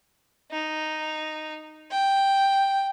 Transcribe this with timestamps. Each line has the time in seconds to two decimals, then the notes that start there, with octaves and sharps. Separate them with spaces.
0.51 D#4
1.91 G5